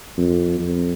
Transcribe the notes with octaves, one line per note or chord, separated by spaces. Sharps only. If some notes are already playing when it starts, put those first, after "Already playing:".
F2
F2